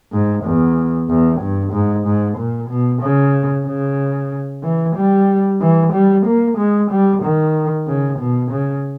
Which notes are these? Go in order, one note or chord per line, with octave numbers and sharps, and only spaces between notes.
G#2
E2
E2
G2
G#2
G#2
A#2
B2
C#3
C#3
E3
G3
E3
G3
A#3
G#3
G3
D#3
C#3
B2
C#3